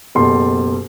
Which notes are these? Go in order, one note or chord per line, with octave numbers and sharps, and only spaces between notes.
F#1 B2 G4 A4 C6